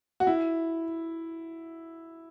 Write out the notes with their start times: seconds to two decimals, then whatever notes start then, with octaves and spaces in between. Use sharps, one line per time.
0.20 F#4
0.27 E4